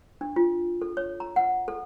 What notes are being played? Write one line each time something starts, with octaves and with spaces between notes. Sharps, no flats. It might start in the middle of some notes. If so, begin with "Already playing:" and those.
D4
F4
A4
C#5
A#5
F#5
A4